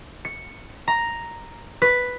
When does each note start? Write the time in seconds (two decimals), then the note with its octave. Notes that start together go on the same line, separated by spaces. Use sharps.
0.25 C#7
0.88 A#5
1.82 B4